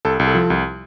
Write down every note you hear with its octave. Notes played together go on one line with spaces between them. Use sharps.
C2 A4
C2
A4
F3
C2